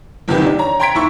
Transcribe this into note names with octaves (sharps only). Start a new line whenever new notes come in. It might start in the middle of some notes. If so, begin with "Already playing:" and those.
G1 E2 C3 D#3 G4 B4
D4
C#5 A#5
G5 A#5 C6 G#6 B6 D7
D#2 E4 C#6